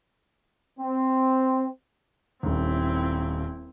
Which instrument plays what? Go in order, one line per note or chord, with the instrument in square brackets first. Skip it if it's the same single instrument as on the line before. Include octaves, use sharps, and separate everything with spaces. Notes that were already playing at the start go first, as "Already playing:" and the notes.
[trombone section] C4
[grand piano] D#1 D#2 [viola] C4 E4